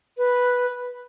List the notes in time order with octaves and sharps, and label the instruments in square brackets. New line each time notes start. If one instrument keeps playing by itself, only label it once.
[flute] B4